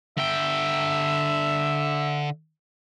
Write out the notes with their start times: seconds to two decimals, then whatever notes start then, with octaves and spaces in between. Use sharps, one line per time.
0.18 D3 E5 G5